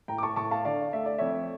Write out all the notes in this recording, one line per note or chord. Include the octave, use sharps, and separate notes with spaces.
A2 G5 A#5
D6
A5 C#6
A2 A5 C#6
F5 A5
D3 D5 F5
A3 E5
D5
F2 C#5 E5